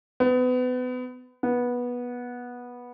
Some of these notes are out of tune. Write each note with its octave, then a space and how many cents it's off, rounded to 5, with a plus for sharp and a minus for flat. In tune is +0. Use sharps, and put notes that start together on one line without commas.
B3 +30
B3 -15